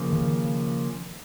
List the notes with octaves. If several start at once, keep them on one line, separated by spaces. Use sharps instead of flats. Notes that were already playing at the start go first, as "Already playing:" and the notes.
Already playing: C#3 F3 A#3
D#3